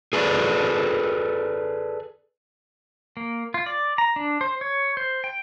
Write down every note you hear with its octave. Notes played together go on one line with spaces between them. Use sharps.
G#4 A4 B4 D5
A#3
F4
D5
A#5
D4
C5
C#5
C5
G5